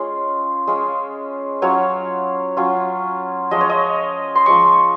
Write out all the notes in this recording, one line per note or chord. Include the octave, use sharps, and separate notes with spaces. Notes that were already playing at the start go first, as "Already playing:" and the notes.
Already playing: G#3 C#4 F4
G#3 C#4 F4
F#3 C#4 F4 C#5
F#3 C#4 F4
F3 G#3 C#4 D#5
C#5
D#5
C6
F3 G#3 C#4 C#6